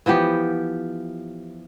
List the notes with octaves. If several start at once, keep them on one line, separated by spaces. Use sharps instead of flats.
E3 F3 B3 G4